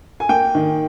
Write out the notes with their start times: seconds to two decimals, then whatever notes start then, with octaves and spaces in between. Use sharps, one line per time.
0.20 G#5
0.29 A#3 G5
0.55 D#3